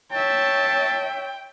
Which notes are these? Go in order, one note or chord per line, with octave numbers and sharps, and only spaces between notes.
C#5 E5 G5 A5